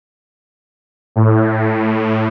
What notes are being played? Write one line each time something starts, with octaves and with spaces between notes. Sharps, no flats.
A2